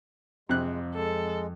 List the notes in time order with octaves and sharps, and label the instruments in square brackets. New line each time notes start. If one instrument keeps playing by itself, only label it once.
[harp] F2 [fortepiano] C3 F#6 [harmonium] G#3
[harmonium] G#3 [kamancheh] A4